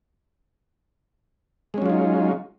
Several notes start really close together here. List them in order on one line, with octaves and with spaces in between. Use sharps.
G#3 C#4 F#3 F4 D#4